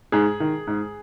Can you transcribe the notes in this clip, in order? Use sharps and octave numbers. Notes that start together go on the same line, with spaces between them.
G#2 G#4
D#3
G#2